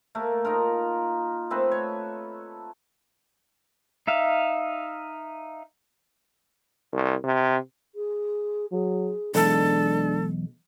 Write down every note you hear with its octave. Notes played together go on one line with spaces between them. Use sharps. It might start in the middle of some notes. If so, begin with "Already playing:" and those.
A3 A#3
D#4 F4 A#4
A3 C4 A4 B4
C#5
D#4 E5 F5
C2
C3
G#4
F#3 G#4
B1 E2 G#3 D4 A4